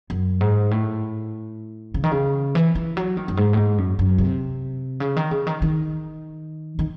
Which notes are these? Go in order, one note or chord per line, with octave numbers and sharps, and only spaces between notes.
F#2
G#2
A2
C#3
D#3
C#3
E3
E3
F#3
D#3
F#2
G#2
A2
G#2
F#2
F#2
C3
C#3
D#3
C#3
D#3
D#3
D#3